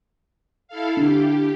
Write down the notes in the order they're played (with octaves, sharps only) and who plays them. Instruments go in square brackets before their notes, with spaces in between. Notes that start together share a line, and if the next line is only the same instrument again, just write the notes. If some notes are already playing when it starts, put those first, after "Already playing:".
[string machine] E4 A4 F5
[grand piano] D3 [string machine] G4